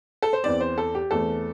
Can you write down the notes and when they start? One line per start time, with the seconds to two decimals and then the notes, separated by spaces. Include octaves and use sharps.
0.22 A4
0.33 C5
0.44 E2 E3 C4 D5
0.61 C5
0.78 A4
0.95 G4
1.11 E2 E3 A3 C4 A4